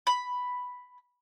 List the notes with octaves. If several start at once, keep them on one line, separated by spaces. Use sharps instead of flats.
B5